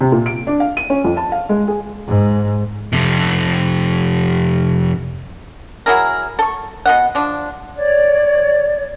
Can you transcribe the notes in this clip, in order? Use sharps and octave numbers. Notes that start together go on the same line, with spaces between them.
C3
A#2
D7
D4
F5
D#7
C#4
F2
A5
F5
G#3
G#4
G#2
F2 C3
F#3 E4 G#4 A#4
A4 C#6
B2 D#5 F#5
F3 D4
C#5 D5